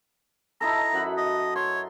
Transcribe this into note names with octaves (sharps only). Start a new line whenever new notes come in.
D#4 E4 A4 A#5
F#2 F#5 B5
D#5
C#5 C6